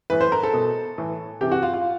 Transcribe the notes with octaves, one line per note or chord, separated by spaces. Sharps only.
A2 E3 B4
C5
A#4
A4
B2
A2 E3
C3 E3 G4
F#4
F4
F4